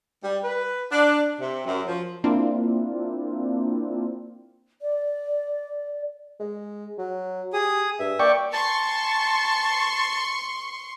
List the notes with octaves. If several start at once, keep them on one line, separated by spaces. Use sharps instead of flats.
G3
B4
D4
C3
F#2
F3
A#3 C4 D4 E4 F4
D5
G#3
F#3
G4 G#4 D#6
G2 E5
A#3 D5 G5 C#6
A5 C6 C#6